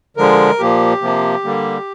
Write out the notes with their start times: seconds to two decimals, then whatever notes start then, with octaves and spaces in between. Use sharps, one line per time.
0.17 D3 F3 G#3 A#4
0.59 A#2 F3 A#3 G4
1.02 C3 F3 A#3
1.44 D3 G3 A#3